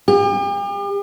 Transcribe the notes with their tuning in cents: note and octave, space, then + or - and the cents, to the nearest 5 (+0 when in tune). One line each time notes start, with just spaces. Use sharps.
G4 +40